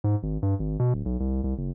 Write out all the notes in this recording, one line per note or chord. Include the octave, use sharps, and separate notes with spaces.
G#2
G#1
G2
G#1
B2
D1
B1
C2
C2
F#1